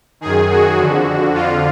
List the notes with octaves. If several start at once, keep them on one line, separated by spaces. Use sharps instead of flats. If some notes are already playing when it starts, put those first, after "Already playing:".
F#2 D#3 G#4
F#4
F2 D3
F2 D3 F4